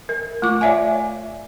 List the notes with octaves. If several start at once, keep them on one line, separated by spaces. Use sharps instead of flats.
A#4
A3 F4 D6
C#5 D5 E5 F5 G#5